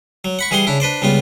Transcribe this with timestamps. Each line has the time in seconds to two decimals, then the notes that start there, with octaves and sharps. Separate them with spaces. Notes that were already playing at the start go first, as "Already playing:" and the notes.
0.24 F#3
0.39 F#5 B5 C#6
0.51 E3 G3 G#4 F#5 C6
0.67 C#3 D4 E4
0.80 D4 B4 C5 D5
1.02 C#2 G3 B3 F4